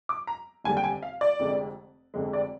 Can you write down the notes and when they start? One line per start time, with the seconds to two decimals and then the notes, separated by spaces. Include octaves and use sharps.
0.09 D6
0.27 A#5
0.64 F1 D#2 D3 G3 G#5
0.77 G5
0.84 G#5
1.03 F5
1.21 D5
1.39 F1 F2 D3 G#3
2.14 F1 F2 D3 G#3
2.33 D5